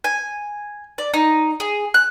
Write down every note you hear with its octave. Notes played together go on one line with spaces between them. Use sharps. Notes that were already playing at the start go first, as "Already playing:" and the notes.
G#5
D5
D#4
G#4
F#6